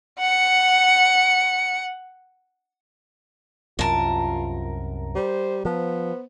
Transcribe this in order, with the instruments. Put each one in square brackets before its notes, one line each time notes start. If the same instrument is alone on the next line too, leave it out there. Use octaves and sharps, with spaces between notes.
[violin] F#5 C#7
[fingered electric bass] C2 F#2 [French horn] F4 [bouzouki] A#4 A5
[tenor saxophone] G3 [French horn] C5
[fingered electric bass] F3 [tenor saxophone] B3 [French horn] C5